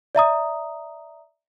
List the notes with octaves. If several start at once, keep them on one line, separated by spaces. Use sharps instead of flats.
D5 E5 A#5 D#6